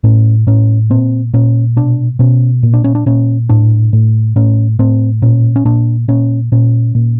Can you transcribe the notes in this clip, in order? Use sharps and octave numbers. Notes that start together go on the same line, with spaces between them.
A2 C#4
A2 C#4
A#2 C4
A#2 C#4
B2 D4
B2 C#4
A#2
D4
C#4
D4
A#2 C#4
A2 D4
A2
A2 C#4
A2 C4
A#2 C#4
C#4
A#2 D4
A#2 C#4
A#2 C#4
A#2